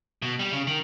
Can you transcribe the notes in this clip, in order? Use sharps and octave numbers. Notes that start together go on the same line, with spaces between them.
B2
G3
C#3
D#3